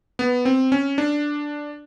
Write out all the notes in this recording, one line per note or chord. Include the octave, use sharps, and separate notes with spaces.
B3
C4
C#4
D4